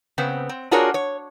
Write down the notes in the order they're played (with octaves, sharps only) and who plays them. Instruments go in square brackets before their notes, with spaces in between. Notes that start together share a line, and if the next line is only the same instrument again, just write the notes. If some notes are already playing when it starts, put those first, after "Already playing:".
[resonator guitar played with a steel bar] C#3 B3 C4
C4
D4 F4 F#4 G#4 A#4 C#5
C#5